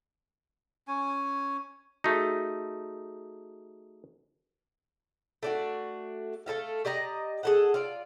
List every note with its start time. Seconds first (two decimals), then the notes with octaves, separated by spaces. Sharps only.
0.88 C#4 G#5
2.04 A3 D#4 F#4 G#4
5.43 A3 D4 F#4
6.46 A3 A4 E5 F5
6.85 G4 D5 D#5 A#5
7.43 G#4 A4 F#5
7.74 F4 D5